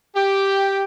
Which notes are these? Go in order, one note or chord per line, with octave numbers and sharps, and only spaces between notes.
G4